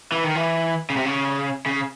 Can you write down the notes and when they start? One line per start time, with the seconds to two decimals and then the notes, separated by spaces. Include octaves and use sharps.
0.12 E3
0.24 D#3
0.36 E3
0.90 C#3
0.97 C3
1.05 C#3
1.66 C#3